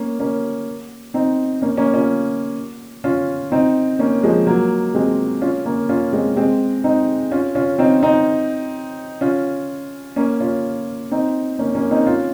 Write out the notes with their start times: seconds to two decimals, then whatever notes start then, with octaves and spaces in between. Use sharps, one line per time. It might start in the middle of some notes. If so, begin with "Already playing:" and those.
Already playing: A#3 C#4
0.19 A#3 C#4
1.14 C4 D#4
1.62 A#3 C#4
1.77 A#3 C#4
1.94 C#4 F4
3.04 C#4 F4
3.52 C4 D#4
3.99 A#3 C#4
4.23 F3 G#3
4.47 F#3 A#3
4.95 G#3 C4
5.41 C#4 F4
5.66 A#3 C#4
5.89 C#4 F4
6.13 G#3 C4
6.36 G#3 C4
6.84 C4 D#4
7.32 C#4 F4
7.55 C#4 F4
7.79 C4 D#4
8.03 C4 D#4
9.21 C#4 F4
10.16 A#3 C#4
10.40 C#4 F4
11.11 C4 D#4
11.59 A#3 C#4
11.75 A#3 C#4
11.91 C4 D#4
12.06 C#4 F4